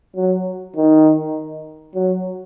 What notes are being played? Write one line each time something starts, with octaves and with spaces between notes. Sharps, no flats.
F#3
D#3
F#3